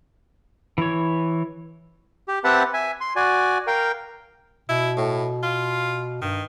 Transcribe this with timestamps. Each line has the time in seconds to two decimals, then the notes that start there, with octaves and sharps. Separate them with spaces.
0.78 E3 C#5
2.28 G4
2.44 C4 G4 B4 E5 F#5 A5
2.74 E5 G#5
3.01 C6
3.16 F#4 D5 G#5
3.67 A#4 F5 G5
4.69 B2 E4
4.97 A2
5.43 F4
6.22 G2 D#3